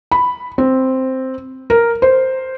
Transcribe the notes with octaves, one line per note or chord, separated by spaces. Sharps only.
B5
C4
A#4
C5